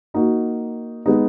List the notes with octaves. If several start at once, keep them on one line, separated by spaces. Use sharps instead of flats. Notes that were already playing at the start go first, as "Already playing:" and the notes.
A#3 D#4 F#4
G#3 B3 D#4